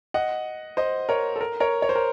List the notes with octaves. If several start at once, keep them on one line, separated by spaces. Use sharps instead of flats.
D#5 F#5
C5 D#5
A#4 C#5
A4
A#4
A#4 C#5
C#5
C5
A#4